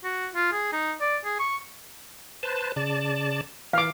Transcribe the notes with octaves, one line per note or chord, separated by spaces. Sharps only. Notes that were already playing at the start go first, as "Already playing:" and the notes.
F#4
F4
G#4
D#4
D5
G#4
C#6
B4 C5 A5
C#3 D5 A5
E3 F5 D6